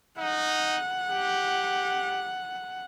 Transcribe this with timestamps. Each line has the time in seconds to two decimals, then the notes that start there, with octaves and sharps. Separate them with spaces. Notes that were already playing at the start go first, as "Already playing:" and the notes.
0.18 D#4 F#5
1.08 G4